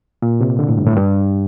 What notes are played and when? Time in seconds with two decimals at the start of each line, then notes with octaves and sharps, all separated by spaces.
0.22 A#2
0.41 C3
0.59 D3
0.68 A2
0.77 G2
0.87 A2
0.96 G2